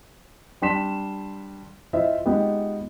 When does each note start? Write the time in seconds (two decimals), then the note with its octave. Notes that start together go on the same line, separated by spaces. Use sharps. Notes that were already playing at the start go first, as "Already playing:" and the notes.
0.62 G3 D4 C6 B6 E7
1.93 E4 F4 C5 D#5 E5
2.26 G#3 B3 D#4 F4 G4